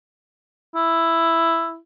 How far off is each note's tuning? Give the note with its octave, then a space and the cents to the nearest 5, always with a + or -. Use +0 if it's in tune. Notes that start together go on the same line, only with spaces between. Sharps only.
E4 +5